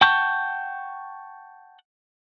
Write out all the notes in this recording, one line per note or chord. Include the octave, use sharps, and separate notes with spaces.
F#5 G5 A5 C#6 G6